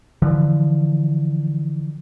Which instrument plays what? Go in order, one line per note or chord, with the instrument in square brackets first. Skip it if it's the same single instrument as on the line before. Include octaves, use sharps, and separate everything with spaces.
[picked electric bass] D3 E3 F3